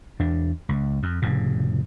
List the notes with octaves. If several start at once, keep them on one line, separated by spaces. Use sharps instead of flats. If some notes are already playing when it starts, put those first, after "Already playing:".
E2 D4
C#2
F2
F1 A2 C#3